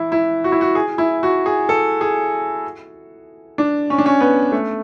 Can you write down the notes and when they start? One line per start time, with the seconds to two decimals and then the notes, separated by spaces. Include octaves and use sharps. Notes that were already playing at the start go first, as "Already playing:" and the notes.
Already playing: E3 E4
0.12 E4
0.44 F#4
0.52 E4
0.61 F#4
0.75 G#4
0.98 E4
1.23 F#4
1.46 G#4
1.69 A4
2.01 G#4
3.58 D4
3.90 C#4
3.98 D4
4.06 C#4
4.20 B3
4.52 A3